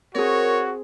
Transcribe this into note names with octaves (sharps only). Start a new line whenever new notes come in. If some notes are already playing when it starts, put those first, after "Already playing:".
C4 F#4 G#4 A#4 C#5